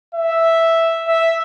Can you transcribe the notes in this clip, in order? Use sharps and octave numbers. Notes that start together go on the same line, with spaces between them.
E5
E5